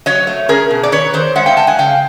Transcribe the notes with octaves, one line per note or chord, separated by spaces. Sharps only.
F#3 C#5 D#5
A3
C#4 G#4 A#4
B2
D5
D#3 B4 C#5
D#3 C5 D5
G#3 E5 F#5
F5 G5
G#3 G5 A5
F#5 G#5
C#3 F5 G5